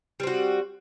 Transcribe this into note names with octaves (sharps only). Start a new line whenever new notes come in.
G3 C4 F#4